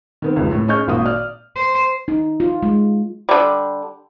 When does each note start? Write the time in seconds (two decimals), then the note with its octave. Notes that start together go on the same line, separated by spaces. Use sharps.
0.22 D#3 B3 C4
0.36 F1 C#2
0.52 A2
0.68 C#4 G#4 D#5 C#6 F6 G6
0.87 G#1 A#2 F#4 D#6
1.06 D5 F6
1.55 C5
2.08 D#4
2.40 F4
2.63 G#3
3.29 D3 G3